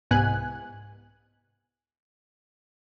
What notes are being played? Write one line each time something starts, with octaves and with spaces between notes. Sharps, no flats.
C2 G#2 B3 G#5 F#6